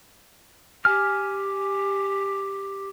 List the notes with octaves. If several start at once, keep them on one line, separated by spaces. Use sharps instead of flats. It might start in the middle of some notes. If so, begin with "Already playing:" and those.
G4 G#5 F6